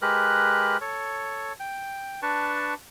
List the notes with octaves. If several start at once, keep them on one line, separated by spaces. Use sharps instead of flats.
G#3 G4 A#4 B4 F#6
A4 C#5
G5
D4 B4 A5 C#6